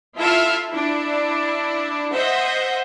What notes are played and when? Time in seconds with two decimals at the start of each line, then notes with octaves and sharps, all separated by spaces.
0.16 E4 F4 A4 E5 F5
0.69 D4 E4
2.14 C5 D#5 E5 F#5